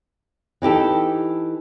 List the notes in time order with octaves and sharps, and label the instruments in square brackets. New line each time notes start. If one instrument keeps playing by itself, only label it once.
[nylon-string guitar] E3 D#4 G4 A4